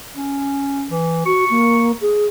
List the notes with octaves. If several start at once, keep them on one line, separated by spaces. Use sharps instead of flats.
C#4
E3
F#4 C#6
A#3
G#4